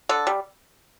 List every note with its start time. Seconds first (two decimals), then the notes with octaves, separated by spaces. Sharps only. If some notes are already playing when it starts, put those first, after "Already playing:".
0.09 D3 A4
0.27 G3